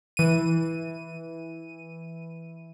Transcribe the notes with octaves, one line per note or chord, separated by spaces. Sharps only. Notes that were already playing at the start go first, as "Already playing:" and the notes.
E3 D#7